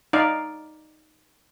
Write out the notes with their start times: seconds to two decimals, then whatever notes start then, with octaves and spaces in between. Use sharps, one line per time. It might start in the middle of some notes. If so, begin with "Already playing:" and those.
0.13 D#4 D5 F5